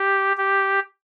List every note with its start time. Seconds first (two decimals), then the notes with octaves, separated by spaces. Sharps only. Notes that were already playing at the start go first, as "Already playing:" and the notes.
Already playing: G4
0.37 G4